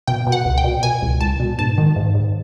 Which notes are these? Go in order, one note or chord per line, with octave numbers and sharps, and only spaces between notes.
B2 G5
B2
F#5
C#2
G5
B2
B2 G#5
C#2
C#2 A5
B2
G#2 A5
D#3
G#2
G#2